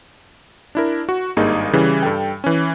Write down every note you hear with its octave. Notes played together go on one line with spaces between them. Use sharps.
D4 E4 A#4
F#4
G#1 G2 A#3 D#4 G#4
C#3 E3 G3
G2 A4 G5
E3 C#4